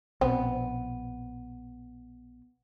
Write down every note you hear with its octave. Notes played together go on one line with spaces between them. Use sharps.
A#1 B2 B3 C4